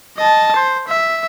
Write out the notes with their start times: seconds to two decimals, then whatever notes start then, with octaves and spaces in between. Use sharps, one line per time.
0.17 D#5 A5
0.56 C5
0.88 E5